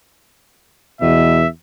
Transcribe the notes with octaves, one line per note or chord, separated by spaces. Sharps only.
E2 B2 E5